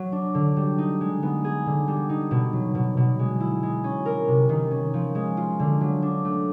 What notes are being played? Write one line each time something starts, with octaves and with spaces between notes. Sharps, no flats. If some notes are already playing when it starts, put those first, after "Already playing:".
Already playing: F#3
D4
D3
G3
D#4
G#3
B3
G#4
D3
G3
D#4
B2
F#3
B2
B2
G#3
E4
G#3
C#4
A#4
C3
D#3
C#4
F3
G#3
F4
D3
F#3
D4
A3